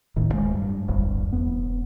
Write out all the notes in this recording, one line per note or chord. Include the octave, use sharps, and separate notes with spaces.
D1 A1 A2 D#3
D1 G#1 G#3
G2
D1 G1 E2 G2
E1 B3